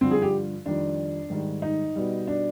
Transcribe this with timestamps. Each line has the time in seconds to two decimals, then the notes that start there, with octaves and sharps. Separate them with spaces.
0.01 G2 D3 F3 C4
0.11 G#4
0.22 G4
0.65 F2 D#3 G3 D4
1.30 G#2 D#3 G3
1.62 D#4
1.95 B2 G3
2.27 D4